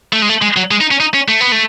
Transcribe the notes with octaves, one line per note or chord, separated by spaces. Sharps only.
A3
G#3
A3
G#3
F#3
G#3
D#4
C#4
D#4
C#4
A3
B3
A3